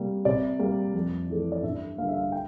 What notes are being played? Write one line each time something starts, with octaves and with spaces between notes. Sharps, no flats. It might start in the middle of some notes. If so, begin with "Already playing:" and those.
Already playing: C3 G3 A#3
C3 D5
G3 A#3
F2
E3 A3
D5
G2 E5
D3 G3 A#3 F5
E5
F5
G5